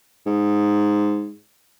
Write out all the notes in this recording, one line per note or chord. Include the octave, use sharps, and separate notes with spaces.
G#2